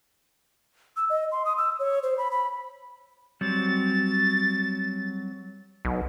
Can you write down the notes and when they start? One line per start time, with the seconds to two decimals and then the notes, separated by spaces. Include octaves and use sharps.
0.97 E6
1.10 D#5
1.32 C6
1.45 D#6
1.58 E6
1.79 C#5
2.03 C5
2.18 B5
2.31 B5
3.41 F#3 G3 C4 A6
5.85 B1